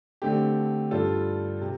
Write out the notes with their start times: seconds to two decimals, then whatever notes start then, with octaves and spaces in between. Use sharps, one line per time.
0.22 D3 A3 C4 G4
0.91 G2 G3 F4 A4
1.61 C3